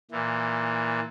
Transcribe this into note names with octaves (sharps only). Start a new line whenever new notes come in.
A#2 E3